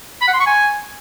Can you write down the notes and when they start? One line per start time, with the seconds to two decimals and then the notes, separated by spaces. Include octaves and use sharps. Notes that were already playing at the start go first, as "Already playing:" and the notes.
0.21 B5
0.27 F#5
0.34 C6
0.40 C#6
0.46 G#5